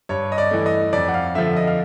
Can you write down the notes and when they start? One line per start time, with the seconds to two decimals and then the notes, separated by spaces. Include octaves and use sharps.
0.09 G2 C#5
0.32 D#5
0.38 D5
0.51 E3 A3
0.66 D#5
0.93 F2 D5
1.08 F#5
1.14 F5
1.35 D3 F3 E5
1.56 D#5
1.67 F5